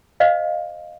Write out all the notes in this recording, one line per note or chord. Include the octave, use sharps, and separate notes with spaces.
C5 D#5 F5